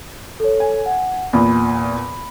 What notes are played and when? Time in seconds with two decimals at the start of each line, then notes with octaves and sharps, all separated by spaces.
0.40 A4 C#5
0.60 G#5
0.86 F#5
1.33 E2 A#2 B5